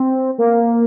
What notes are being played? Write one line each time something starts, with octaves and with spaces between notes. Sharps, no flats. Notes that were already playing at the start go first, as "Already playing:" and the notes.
Already playing: C4
A#3